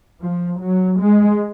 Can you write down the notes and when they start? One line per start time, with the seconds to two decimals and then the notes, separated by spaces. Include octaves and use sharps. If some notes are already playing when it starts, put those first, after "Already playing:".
0.21 F3
0.61 F#3
1.00 G#3